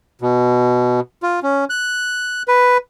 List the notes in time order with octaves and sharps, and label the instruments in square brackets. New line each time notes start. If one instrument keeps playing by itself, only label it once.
[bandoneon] B2
F4
C#4
F#6
B4